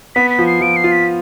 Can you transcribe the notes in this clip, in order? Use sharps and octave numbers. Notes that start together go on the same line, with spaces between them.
B3 B6
B6
F3
C7
F3 D7
C7
F4
B6